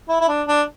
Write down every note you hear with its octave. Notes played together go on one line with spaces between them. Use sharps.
E4
E4
D4
D4